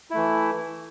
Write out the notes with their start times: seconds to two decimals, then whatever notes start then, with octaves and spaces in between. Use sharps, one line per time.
0.11 E4
0.14 A3
0.17 E3